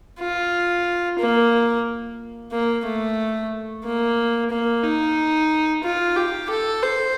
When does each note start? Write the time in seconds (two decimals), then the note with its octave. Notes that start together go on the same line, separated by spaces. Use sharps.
0.20 F4
1.19 A#3
2.52 A#3
2.86 A3
3.84 A#3
4.50 A#3
4.84 D#4
5.84 F4
6.16 G4
6.49 A4
6.83 C5